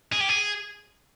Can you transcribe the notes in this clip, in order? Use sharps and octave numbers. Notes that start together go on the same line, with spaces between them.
G#4
G4
G#4